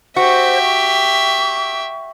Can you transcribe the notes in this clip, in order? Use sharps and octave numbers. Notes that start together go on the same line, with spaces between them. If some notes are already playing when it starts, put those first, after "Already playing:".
F#4 G4 C5 E5
C#6